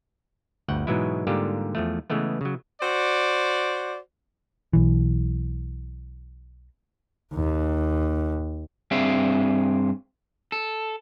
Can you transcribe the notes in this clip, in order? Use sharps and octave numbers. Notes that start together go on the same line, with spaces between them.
G1 D2 F#5 G5
G#2 B2 E3 F#3 G#3 E4
G#2 D3 G3 A#3 F4 G4
E2 F3 A3
C#3 E3 G#3 A3 B3
C#3 F#3
F#4 C5 D5
B1 E3
D#2
G2 C4 G#4 E5 F5
A4